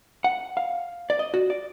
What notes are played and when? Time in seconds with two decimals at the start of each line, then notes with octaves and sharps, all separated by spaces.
0.24 F#5
0.57 F5
1.10 D5
1.19 D#5
1.34 F#4
1.50 D5